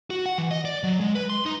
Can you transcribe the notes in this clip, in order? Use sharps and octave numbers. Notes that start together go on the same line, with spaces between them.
F#4
F#5
E3
D#5
D5
F#3
G#3
B4
C6
D#4